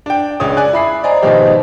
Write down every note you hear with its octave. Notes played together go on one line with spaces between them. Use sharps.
D4 G5
C#2 C#3 C#4 D4 C#5 D#6
D5 G#5 F#6
E4 B5 C7
C5 D5 D#5 G#5 A#5
G#2 B2 D#3 F3 D#4 G4